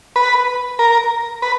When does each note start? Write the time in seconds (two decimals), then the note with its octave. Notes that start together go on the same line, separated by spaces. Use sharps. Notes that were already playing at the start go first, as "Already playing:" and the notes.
0.16 B4
0.79 A#4
1.42 B4